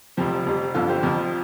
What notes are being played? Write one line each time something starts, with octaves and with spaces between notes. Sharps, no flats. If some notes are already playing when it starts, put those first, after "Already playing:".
F1 F2 C3 F3 G4 C5
F1 F2 C3 G3
G1 F2 D3 F4 A4
G4 C5
F1 F2 F3